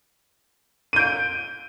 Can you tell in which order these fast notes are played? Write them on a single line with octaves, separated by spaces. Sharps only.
D#7 G6 D7